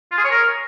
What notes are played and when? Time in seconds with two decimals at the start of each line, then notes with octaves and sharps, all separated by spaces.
0.11 F4
0.18 G#4
0.24 C#5
0.31 A#4